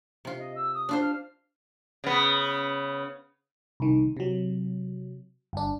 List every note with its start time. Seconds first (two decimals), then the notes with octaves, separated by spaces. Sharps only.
0.25 C3 F4
0.38 D#5
0.56 E6
0.74 D#6
0.89 D4 F4 C5
1.01 F6
2.04 C#3 B3
3.80 C2 D#3
4.17 C3 F#3
5.53 G1 D4